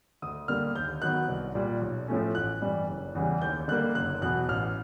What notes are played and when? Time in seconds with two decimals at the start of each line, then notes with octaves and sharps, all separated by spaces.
0.22 D2 D#6
0.48 D3 G3 A#3 F6
0.75 D#2 G6
1.02 D#3 F#3 B3 F#6
1.29 C2
1.55 A#2 G3
1.81 B1
2.08 A2 F3 A3 C#4
2.35 A1 F#6
2.62 G2 E3 G3
2.89 F#1
3.15 E2 C#3 E3 G3
3.41 D#2 G6
3.68 D3 G3 A#3 F#6
3.95 F#1 F#6
4.21 E2 B2 F#3 B3 F#6
4.49 A1 F6